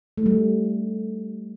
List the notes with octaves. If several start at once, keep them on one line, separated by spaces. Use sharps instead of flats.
A3
G3